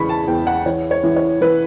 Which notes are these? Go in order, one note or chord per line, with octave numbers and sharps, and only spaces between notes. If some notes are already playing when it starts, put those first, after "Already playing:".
Already playing: E2 C#3 E3 B5 C#6
A5
E2 G5
F#5
E3 C#5
C#5
E3
C#5
E3 B4